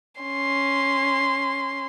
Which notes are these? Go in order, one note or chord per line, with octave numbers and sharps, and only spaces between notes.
C#4 C6